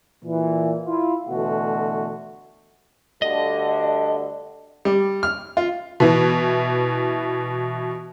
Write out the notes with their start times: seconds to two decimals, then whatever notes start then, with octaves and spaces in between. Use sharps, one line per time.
0.24 A#2 E3
0.85 E4 F4
1.27 B2 D3 E3 A3 F#4
3.22 D2 G2 D3 D#5
4.85 G3
5.23 F6
5.57 F4
6.00 B2 E3